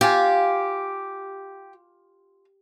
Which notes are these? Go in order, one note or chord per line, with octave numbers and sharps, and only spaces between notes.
F4 G4 F5 G#5